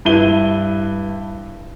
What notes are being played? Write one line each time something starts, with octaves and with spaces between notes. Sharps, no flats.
G2 E4 D#7 G7